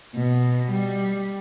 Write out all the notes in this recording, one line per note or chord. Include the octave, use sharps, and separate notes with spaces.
B2
G3